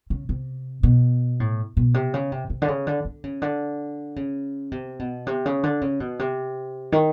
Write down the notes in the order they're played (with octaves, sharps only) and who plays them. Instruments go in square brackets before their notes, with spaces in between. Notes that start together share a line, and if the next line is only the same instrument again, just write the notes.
[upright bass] C#3
C3
B2
A2
B2
C3
C#3
C3
C3
D3
C#3
D3
D3
C#3
D3
C#3
C3
B2
C3
C#3
D3
C#3
B2
C3
D#3